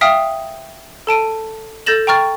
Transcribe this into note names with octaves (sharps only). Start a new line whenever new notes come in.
E5 F5 G5 D#6 F6
A4 A5 D7 D#7
A4 G6 A6 A#6 E7 F#7
G5 A#5 C#6 F6 A6